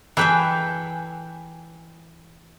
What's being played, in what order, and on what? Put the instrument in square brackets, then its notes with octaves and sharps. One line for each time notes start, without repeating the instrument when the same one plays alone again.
[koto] E3 B4 E5 [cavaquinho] G#4 A4 G5